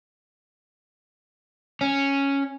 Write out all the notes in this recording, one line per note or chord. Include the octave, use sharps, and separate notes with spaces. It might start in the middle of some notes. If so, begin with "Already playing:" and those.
C#4